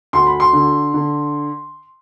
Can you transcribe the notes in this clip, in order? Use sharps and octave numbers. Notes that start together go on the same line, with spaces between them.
D2 C6
B5
C6
D3
D3